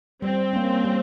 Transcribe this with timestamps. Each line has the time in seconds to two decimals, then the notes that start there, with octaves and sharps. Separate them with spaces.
0.22 G3 C4
0.53 A#3 C#4
0.84 G3